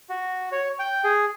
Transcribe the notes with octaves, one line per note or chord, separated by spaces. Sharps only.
F#4
C#5
G5
G#4